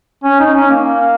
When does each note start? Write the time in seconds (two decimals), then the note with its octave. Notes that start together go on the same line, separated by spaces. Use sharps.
0.24 C#4
0.39 D#4
0.55 C#4
0.70 A#3